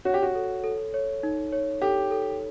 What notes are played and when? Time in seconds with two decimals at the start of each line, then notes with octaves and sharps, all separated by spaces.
0.05 F#4 C#5
0.14 G4
0.22 F#4
0.35 A4
0.64 A4
0.94 C#5
1.23 D#4
1.53 C#5
1.82 G4 A4
2.11 A4